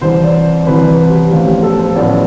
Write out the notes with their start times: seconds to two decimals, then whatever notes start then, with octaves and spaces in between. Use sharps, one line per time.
0.01 C2 C3 E3 C5
0.24 D5
0.67 C2 C3 E3 B4
1.10 G4
1.31 A1 A2 F3 B3 F4
1.47 G4
1.63 A4
1.79 C5
1.95 A1 A2 F3 B3 D5